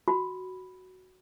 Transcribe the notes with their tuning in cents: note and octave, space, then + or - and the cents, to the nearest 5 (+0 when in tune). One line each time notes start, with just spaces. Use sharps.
F#4 +0 B5 +0